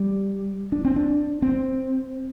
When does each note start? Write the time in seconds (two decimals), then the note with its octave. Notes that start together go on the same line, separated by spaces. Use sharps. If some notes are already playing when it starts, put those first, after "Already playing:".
Already playing: G3
0.72 D4
0.85 C4
0.96 D4
1.42 C4